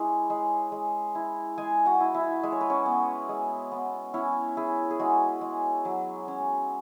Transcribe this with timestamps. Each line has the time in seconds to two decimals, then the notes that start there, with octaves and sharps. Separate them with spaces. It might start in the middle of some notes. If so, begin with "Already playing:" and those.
Already playing: G#3 C#4 E4 B5
0.30 G#3
0.72 G#3
1.15 E4
1.58 G#3 G#4 G#5
1.85 F#4 F#5
2.00 E4
2.14 E4 E5
2.43 G#3 E5
2.52 C#5
2.61 B4
2.70 C#4 C#5
2.86 B3
3.29 G#3
3.72 B3
4.14 C#4 E4 C#5
4.57 E4 G#4
4.91 G#4
4.99 G#3 F#4
5.41 G#3
5.85 F#3
6.28 C#4